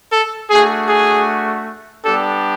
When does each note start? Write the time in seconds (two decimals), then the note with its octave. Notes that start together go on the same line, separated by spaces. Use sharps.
0.12 A4
0.50 A3 D4 F#4 G#4
0.89 G#4
2.05 G3 B3 D4 G4 A4